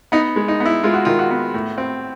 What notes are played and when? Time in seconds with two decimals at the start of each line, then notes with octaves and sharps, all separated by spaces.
0.12 B3 D#4
0.36 G#3
0.48 D#4
0.60 B3
0.65 E4
0.84 G#3 F4
0.94 F#4
1.05 D#3 F4
1.19 F#4
1.31 B3
1.54 A2
1.78 C4